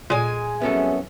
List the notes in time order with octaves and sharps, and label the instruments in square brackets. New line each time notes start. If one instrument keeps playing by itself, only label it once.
[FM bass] A#2 [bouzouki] G#3 G#5
[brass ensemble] C2 F#2 E5 [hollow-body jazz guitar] B3 C#4 A4